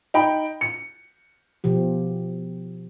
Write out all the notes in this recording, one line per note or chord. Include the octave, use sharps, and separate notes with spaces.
D#4 G5 B5
C#7
B2 F3 G4